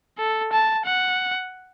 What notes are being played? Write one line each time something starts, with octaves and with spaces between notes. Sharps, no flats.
A4
A5
F#5